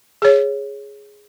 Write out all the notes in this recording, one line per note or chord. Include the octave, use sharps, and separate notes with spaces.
G#4 C#5